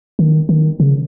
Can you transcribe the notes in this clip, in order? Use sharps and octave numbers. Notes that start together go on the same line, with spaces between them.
D#3
D#3
C#3